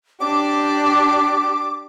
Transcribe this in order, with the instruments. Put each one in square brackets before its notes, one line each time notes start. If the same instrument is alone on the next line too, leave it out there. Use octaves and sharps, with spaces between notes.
[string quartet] D4 G4 [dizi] D6